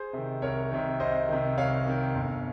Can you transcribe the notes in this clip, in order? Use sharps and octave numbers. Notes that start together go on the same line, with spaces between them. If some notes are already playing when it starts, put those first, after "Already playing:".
Already playing: G#4 C5
C3 D#3
C2 A#4 C#5
C3 D#3
C2 C5 D#5
C3 D#3
C2 C#5 F5
C3 D#3
G1